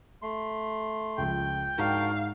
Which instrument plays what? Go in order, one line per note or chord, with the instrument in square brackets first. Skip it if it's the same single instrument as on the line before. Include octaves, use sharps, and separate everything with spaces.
[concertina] A3 C6
[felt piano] C#2 F3 [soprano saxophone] G5
[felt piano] G#2 [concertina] D4 F#4 A#4 [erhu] F5